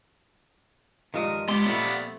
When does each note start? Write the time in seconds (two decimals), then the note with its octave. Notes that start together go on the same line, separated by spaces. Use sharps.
1.14 G2 D#3 F3 G#3 A#4 D#6
1.49 G#3 B3 G4 C6
1.66 A#2 A3 C4 D5 F5 B5